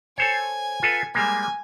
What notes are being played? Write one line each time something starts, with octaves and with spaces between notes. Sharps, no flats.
A4 C5 C#5 G#5
F4 A4 B4
G3 G#3 A#3 G#5